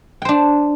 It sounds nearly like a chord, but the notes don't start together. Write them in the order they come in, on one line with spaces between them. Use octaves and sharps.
G5 C5 D4